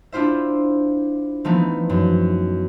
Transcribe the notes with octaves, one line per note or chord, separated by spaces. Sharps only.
D4 E4 F4 C5 E5
E3 F3 A3 B3 D#4
F#2